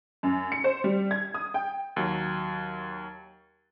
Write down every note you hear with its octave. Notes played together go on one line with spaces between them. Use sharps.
F#2
C#7
C5
G3
G#6
D#6
G5
D#2 F#3